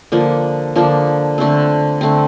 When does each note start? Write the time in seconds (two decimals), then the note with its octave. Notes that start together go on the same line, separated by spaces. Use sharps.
0.12 D3 F3 A#3 D4
0.76 D3 F3 A#3 D4
1.38 D3 A3 C4
2.01 D3 A3 C4